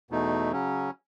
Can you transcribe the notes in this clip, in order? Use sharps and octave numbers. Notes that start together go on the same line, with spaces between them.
E2 B2 A3 D#4
C#3 F#3 C#4